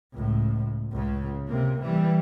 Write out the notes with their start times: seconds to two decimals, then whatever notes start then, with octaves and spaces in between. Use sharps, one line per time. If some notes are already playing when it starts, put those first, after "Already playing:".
0.14 C#2 A2
0.91 C#2 C#3
1.48 C3 A#3
1.81 E3 G3